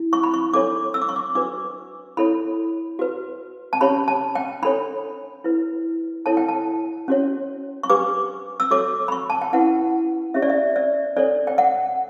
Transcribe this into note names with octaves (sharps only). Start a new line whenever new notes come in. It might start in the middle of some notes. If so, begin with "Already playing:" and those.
Already playing: E4
C#6
B5
C#6
D4 A4 C#5 D6
E6
D6
C#6
D6
D4 F#4 B4 D6
E4 A4 C#5 B5
F#4 B4
A5
C#4 G4 C#5 B5
A5
G5
D4 A4 C#5 B5
E4 B4
E4 A4 C#5 A5
G5
A5
C#4 F#4 C#5
C#6
D4 G4 B4 D6
E6
F#4 A4 C#5 D6
B5
C#6
A5
G5
C#4 E4 B4 F#5
C#4 G4 C#5 E5
D5
E5
D5
D4 A4 C#5 D5
G5
F#5